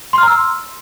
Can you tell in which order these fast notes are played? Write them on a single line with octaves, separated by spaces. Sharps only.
C6 F6 A#5 E6